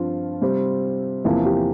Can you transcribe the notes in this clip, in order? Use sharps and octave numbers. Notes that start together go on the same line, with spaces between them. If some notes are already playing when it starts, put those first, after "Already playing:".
Already playing: G2 F3 C4 F4
C3 G3 C4
E2 C3 F3 A#3 E4
G4